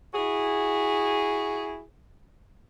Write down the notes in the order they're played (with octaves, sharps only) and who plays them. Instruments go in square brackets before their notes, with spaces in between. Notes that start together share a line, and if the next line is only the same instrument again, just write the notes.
[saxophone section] E4 F#4 G#4